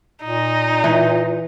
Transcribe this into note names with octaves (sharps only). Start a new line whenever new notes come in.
A#2 D#4
E3